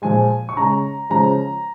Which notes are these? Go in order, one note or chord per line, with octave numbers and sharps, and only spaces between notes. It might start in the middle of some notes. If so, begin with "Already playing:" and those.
A#2 F3 G#3 G#5
C#6
C#3 G#3 A#5
C#3 F3 G#3 A#5